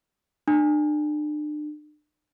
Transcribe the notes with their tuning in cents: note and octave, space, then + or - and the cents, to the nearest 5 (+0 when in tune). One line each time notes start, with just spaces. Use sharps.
D4 +35